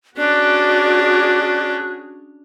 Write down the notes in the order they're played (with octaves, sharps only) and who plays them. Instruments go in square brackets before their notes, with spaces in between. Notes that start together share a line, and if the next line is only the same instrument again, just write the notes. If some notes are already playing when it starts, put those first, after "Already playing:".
[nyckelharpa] C#4 D4 [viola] F#4 G#4 [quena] D5 [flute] F#6